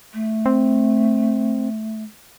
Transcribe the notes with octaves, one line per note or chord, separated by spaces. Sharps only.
A3
C4